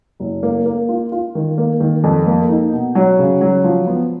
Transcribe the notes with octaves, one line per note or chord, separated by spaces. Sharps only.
F#1
A#3
A#3
F4
F4
D#3
A#3
D#3
F2
A#3
D#4
B2
F#3
C#3
F#3
F3
B3